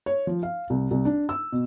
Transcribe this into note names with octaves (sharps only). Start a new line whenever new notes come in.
C#5
F3
F5
C2
C2
D4
E6
B2